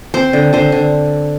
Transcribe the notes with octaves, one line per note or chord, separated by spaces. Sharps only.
C4 C5
D3
D3 C5
D3